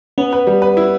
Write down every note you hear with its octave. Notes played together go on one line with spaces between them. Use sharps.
B3 C#4
B4
G3
B4
E4